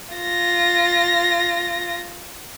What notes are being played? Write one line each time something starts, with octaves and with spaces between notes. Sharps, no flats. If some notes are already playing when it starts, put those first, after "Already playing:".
F4 A#6